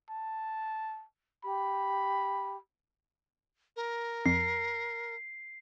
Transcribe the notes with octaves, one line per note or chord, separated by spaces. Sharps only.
A5
G4 B5
A#4
F2 C7